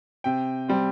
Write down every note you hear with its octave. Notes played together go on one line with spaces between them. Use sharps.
C3 G5
G3 C4